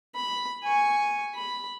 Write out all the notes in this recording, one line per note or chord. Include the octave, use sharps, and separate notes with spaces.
B5
G#5 C#6
B5